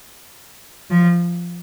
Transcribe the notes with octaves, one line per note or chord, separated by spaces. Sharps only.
F3